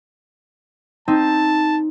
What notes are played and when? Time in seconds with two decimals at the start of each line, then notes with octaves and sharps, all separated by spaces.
1.08 C4 D#4 A5